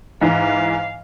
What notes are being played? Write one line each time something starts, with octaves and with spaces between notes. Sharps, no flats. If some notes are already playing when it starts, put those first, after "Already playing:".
G#2 E3 F5